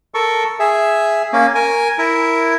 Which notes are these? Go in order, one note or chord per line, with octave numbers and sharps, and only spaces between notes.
A4 A#4 C#6
G#4 E5
A#3 C#4
A#4 G#5
E4 A#4